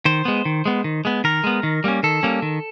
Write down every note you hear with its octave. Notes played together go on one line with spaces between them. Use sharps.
D#3 C5
G#3 B3
D#3
G#3 B3
D#3
G#3 B3
D#3 A#4
G#3 B3
D#3
G3 A#3 C#4
D#3 A4
G3 A#3 C#4
D#3